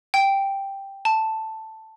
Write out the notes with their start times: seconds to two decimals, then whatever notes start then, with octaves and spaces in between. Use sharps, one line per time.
0.14 G5
1.05 A5